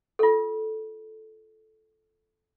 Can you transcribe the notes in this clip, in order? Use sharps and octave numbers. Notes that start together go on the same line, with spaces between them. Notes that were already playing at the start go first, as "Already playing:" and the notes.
F4 A4